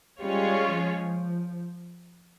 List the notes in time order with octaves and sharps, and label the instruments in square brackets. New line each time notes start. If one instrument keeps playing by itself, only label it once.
[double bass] G3 [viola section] G#3 C#4 F4 G#4 C#5
[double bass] F3